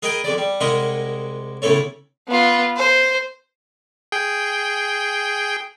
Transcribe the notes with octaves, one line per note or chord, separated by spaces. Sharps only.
G#4 A#4 B4 D#5 G5 G#5
F2 G#3 D5
G3
C2 G#3 A#4 D#5 E5 F#5
B1 A2 C#3 A3 A4 C#5
B3 F4
C5
G#4 G5